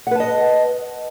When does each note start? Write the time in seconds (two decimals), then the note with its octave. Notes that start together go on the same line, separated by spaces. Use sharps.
0.07 F#5
0.11 B4
0.16 A5
0.20 D#5